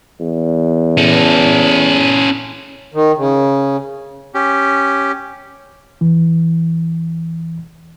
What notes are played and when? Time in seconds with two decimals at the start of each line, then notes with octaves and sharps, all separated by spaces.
0.21 E2
0.97 C#4 A4
2.94 D#3
3.17 C#3
4.34 C#4 G4
6.01 E2 E3